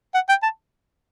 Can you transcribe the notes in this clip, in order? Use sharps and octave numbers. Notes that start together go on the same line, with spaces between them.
F#5
G5
A5